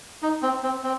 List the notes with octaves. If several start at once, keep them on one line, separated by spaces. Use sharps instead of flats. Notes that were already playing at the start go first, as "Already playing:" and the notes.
D#4
C4
C4
C4